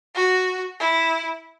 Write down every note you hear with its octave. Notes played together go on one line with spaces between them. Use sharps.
F#4
E4